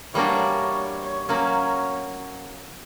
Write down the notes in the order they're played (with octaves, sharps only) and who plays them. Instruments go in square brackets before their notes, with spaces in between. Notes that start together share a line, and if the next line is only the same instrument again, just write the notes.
[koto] E3 G3 A#3 D4 F#4 [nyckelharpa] C#5
[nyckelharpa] C#5
C#5
[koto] F#3 A#3 C#4 F#4 [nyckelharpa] C#5